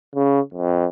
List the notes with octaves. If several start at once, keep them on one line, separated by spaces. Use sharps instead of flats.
C#3
F2